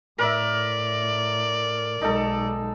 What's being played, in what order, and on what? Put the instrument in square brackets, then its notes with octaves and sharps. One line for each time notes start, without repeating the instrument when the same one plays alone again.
[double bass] A2 [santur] A#4 E5 [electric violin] D5
[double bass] B1 G#3 [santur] D#4 A4